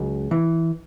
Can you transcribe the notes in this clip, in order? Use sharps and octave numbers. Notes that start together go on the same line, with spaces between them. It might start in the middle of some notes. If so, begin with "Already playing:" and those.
Already playing: C#2 F#3
E3